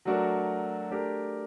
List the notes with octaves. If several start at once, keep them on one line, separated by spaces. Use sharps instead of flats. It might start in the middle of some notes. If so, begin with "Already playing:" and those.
F#3 A3 D4 F#4 A#4
A3 D4 G4 A#4